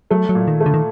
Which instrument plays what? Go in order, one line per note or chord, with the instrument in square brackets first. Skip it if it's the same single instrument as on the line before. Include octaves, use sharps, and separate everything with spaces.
[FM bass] F#3 [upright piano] A3
[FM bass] F#3
[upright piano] A#2
[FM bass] D#3
[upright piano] A3
[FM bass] D3
D#3